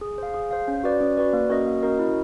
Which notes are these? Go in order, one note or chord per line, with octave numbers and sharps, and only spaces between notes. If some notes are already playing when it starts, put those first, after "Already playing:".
G#4
C5 F5
G#4
C5 F5
C#4
F#4 B4 D5
C#4
F#4 B4 D5
A#3
C#4 F#4 A#4 D#5
A#3
C#4 F#4 A#4 D#5
E4